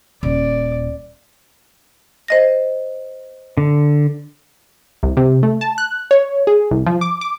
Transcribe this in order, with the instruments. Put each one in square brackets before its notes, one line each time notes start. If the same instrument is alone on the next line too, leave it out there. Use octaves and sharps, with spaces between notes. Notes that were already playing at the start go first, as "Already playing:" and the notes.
[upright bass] D#1 [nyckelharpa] D5
[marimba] C5 D#5 A#6
[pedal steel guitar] D3
[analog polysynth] C2
C3
A3
A5
F#6
C#5
G#4
C2
F3
D6
D6